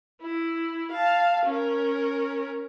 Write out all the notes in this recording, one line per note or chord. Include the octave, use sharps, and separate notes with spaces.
E4
F5 A5
C#4 A#4